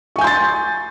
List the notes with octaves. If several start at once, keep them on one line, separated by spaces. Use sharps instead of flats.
G#5 C6 C#6 G6 A6